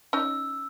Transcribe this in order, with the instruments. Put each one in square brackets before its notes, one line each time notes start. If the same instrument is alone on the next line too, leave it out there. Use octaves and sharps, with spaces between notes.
[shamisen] C#4 D#4 [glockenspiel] E6